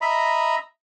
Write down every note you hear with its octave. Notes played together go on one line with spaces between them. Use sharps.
D#5 E5 A#5 B5